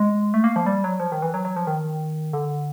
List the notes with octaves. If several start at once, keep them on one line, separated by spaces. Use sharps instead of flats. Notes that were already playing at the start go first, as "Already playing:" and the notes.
Already playing: G#3
A3
A#3
F3
G3
F#3
F3
D#3
E3
F#3
F#3
F3
D#3
D3